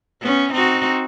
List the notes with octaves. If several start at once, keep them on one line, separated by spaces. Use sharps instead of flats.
B3 C#4
C4 D#4 F#4